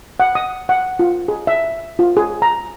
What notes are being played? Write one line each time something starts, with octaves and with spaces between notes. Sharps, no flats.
F#5
D#6
F#5
F4
G#4
E5
F4
G#4
A#5